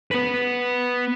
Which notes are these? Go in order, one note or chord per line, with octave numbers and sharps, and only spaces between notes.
B3 B4